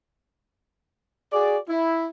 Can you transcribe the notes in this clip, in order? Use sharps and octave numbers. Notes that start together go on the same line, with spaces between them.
F#4 G#4 D5
E4